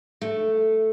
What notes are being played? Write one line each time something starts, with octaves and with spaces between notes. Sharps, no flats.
A3